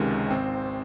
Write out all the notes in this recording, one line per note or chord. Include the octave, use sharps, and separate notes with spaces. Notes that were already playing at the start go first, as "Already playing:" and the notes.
Already playing: C#2 C3 D#3 G#3 C#4
G#1 C4 C5